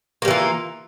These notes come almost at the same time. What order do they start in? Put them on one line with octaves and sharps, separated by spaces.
A#3 G3 E3 F4